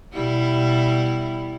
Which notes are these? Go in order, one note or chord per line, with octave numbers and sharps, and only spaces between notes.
B2 G3 E4